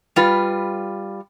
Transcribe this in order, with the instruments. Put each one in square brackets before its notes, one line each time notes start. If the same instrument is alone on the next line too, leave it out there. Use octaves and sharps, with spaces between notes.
[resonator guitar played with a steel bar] G3 F4 B4